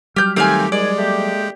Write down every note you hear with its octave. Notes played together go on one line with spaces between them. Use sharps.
F#3 G3 G4 F6 G6
D#3 A3 C4 G4 F5 G#5
D#2 G#3 D#4 D5 G#5
A3 A#3 G4